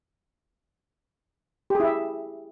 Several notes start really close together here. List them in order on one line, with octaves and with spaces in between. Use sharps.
G4 G#4 E4 E5